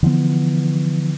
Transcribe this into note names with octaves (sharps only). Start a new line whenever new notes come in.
D3 E3 F3 B3